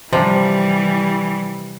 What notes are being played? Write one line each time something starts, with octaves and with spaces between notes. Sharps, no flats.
C3 E3 F3 G3